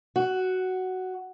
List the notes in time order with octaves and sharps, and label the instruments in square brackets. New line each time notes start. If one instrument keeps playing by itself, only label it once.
[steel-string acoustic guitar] F#4